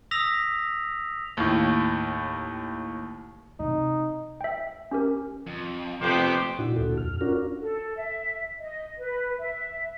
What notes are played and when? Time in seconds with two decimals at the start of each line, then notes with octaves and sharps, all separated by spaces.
0.11 D#6 E6 A#6 B6 F7
1.37 D#2 A2
3.60 C3 D#4
4.41 E5 G5
4.91 C#4 G4 A#4
5.47 F2
6.01 F2 C3 A3 B3 G4 C5 D6
6.58 A#2 D4 E4 F#4
6.76 D2 A#2 F#4 A4
6.97 F2 F6
7.21 C#4 D4 F4 F#4 A#4
7.61 A4
7.96 E5
8.60 D#5
8.98 B4
9.39 E5